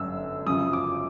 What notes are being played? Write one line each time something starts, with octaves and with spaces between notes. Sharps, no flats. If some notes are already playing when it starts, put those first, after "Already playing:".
Already playing: G1 F#2 D3 E6
F#2 C#3 F3 D#6
D6